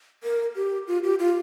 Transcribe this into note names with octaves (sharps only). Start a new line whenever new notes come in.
A#4
G4
F4
G4
F4